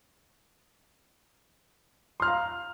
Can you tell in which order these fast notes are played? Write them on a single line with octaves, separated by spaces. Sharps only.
C6 F6 A#5 F5